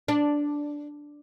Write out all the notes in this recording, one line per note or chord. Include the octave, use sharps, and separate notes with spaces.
D4